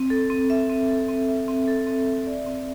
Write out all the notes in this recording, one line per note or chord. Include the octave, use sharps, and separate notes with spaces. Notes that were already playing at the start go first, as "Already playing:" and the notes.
Already playing: C4
A4
C4
E5
C4
A4
C4
E5
C4
A4
C4
E5
D5
C4